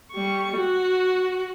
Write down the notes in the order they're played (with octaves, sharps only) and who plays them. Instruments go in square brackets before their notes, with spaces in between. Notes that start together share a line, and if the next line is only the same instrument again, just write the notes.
[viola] G3 C#6
F#4